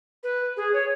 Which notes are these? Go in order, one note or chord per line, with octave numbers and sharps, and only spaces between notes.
B4
G#4
C#5